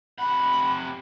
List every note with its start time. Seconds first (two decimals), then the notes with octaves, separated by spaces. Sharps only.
0.18 C3 F#5 B5